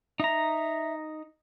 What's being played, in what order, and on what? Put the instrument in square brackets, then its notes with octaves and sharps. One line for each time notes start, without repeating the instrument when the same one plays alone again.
[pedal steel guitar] D#4 A#5 [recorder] E5